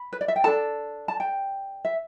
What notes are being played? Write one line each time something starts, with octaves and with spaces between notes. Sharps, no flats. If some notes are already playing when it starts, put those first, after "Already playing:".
Already playing: B5
B4
D5
E5
G5
D4 A4 A5
A5
G5
E5